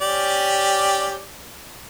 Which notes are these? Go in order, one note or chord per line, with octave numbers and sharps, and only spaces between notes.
C#4 G4 D5